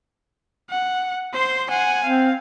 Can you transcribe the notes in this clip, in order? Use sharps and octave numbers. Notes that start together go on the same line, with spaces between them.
F#5
C5 C6
F#5 G#5
C4 F5